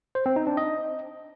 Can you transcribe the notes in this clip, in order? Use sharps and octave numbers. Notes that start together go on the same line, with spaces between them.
C5
C4
D#4
D4
D#5